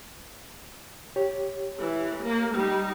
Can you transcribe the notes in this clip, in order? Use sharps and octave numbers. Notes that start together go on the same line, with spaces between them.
G4 C#5
E3
A#3
G3 D#4